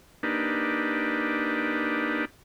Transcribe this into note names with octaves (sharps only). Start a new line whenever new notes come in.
A#3 D4 D#4 G4 B4